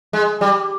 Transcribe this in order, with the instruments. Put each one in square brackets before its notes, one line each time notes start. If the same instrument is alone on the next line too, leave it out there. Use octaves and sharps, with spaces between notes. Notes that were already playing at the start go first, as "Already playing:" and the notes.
[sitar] G#3
G3